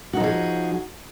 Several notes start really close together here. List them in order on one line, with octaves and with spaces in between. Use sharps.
F#4 D#4 F3 G#4